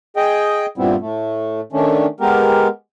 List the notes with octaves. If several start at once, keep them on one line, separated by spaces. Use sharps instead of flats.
G#4 D#5 G5
G2 A#2 G3 B3 C4 E4
A2 A3
D#3 A3 C#4 D4
G#3 B3 G4 A#4